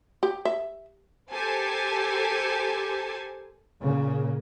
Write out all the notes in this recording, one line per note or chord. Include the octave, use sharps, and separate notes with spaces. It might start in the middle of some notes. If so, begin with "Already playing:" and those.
G4
E5
G4 A4 A#4 C5 G#5 A5
A#2 C#3 A#3